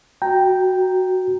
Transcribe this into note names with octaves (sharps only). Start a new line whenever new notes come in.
F#4 G5 A#5